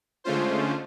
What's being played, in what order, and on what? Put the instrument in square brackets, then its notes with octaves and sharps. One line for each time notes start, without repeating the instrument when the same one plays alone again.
[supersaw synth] D3 G#3 A3 C#4 F4 C5